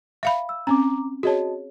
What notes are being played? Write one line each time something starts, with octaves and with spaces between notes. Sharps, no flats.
E5 F5 B5
E6
C4 C#4 A#5 D6
F#4 G#4 C#5 D#5 A5